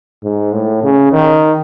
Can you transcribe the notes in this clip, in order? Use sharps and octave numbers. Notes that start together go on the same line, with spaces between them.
G#2
A2
C#3
D#3